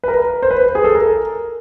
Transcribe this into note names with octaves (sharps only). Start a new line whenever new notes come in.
B4
A#4
C5
B4
G#4
A4
A#4